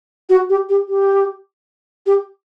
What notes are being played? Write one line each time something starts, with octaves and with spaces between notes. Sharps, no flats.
F#4
G4
G4
G4
G4